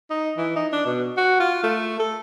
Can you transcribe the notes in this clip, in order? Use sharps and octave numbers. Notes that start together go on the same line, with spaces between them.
D#4
E3
D#4
D4
B2
F#4
F4
A3
A4